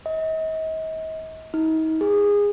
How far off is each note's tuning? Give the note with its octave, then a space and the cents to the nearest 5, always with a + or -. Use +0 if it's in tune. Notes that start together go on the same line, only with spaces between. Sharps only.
D#5 +40
D#4 +40
G#4 -20